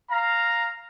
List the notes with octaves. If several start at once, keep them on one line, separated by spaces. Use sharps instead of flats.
F5 A#5